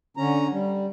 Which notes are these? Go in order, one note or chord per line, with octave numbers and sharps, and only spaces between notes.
D3 C#4 A#5
G3